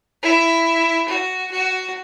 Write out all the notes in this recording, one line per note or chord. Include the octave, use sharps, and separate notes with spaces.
E4
F#4
F#4